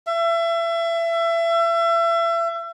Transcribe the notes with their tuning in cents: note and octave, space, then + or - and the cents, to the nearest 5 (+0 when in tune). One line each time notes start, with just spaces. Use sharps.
E5 +30